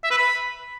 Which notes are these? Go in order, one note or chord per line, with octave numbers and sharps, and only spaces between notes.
E5
B4
B5